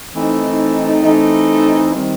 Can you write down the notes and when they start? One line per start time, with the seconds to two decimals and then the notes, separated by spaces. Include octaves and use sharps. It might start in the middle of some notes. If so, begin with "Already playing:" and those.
0.13 E3 A3 C4 D#4
1.03 E3 A3 C4 D#4
1.93 D#3 G3 C4